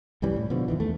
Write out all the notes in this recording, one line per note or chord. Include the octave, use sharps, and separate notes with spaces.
C2 F#2 E3 G3
A2
B2 D3 F3
F2 D#3 E3
E2 A3